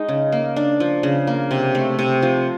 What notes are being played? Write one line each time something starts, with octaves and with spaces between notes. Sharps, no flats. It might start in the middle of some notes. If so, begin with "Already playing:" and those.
Already playing: G#3 D#4
C#3
A#3
D4
F3
C#3
A#3
C3
A3
C3
F3